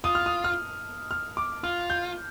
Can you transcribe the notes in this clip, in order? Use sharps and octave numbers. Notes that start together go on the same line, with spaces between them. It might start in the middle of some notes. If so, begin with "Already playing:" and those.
F4 D#6
F6
D#6
F6
F6
D6
F4 F6
G6